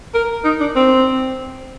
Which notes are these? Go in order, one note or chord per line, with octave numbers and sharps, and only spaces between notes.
A#4
D#4
D4
C4